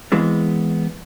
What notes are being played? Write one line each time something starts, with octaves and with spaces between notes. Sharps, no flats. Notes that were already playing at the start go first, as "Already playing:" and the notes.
E3 G#3 B3 C4